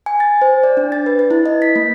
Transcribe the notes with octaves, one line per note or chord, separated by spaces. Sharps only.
G#5
A6
C5
D5
D4
A6
B4
A6
E4
D#5
B6
A#3